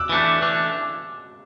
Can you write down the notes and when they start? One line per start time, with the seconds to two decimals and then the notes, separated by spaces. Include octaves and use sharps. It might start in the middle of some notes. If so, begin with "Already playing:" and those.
Already playing: D6 E6 F#6
0.09 E3 A3 D4
0.42 E3 A3 D4